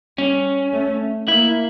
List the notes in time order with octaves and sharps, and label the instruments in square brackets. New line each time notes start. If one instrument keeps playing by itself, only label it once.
[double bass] G3 [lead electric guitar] C#4
[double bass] A3
[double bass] A#3 [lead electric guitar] E4